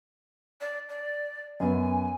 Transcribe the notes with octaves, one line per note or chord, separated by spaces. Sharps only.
D5
D5
F#2 B3 G#5